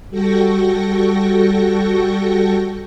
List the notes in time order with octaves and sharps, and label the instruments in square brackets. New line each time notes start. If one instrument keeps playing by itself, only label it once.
[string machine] G3 F#4 A4 G5 C#6 A#6